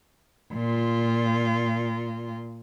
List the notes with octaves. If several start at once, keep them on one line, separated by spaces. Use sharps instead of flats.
A#2 F4